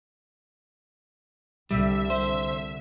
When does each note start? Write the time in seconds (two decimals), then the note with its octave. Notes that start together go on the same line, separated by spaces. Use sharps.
1.71 C2 D3 G3 E5
2.10 C5